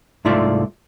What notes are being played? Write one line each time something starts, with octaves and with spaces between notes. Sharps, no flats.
C2 G#2 A3 F4 D5 E5